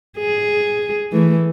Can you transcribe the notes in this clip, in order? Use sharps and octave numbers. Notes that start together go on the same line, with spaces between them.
G#4
E3 A3